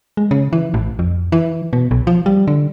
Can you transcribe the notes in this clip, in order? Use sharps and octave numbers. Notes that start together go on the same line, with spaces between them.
G#3
C#3
E3
A1
F2
E3
B2
B1
F3
G3
D3